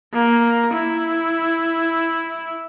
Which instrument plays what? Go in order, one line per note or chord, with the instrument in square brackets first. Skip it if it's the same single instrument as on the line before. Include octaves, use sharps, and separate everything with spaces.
[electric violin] A#3
E4